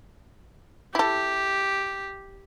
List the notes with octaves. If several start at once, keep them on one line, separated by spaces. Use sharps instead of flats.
E4 G4 A4